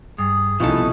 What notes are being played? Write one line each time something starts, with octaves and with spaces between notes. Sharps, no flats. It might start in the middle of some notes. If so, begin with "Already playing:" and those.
G2 G#4
C2 B2 F3 C#4 D#4 E4 A4